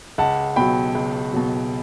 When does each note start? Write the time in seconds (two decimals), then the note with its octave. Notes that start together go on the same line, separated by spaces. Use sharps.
0.18 C#2 F#5 A5
0.56 B2 F#3 G5 B5
0.95 C#2
1.33 B2 F#3